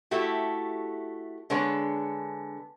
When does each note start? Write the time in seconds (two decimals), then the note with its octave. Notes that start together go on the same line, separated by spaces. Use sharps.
0.11 A3 E4 F#4 G4 A4
1.50 D3 G#3 B3 C#5